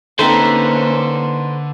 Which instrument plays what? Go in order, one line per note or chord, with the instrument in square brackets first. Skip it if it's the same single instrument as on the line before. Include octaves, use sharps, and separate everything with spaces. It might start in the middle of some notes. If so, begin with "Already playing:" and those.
[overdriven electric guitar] D3 [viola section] A#3 C#4 [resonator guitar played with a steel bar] C4 D#4 A4 [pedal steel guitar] B4 C5